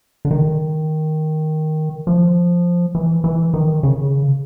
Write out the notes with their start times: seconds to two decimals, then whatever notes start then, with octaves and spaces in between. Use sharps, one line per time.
0.25 D3
0.31 D#3
2.07 F3
2.95 E3
3.24 E3
3.54 D#3
3.83 C#3